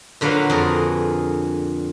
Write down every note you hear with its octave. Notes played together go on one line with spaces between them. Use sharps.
A#2 D3 F#3 B4 F5
F2 G#4 A#4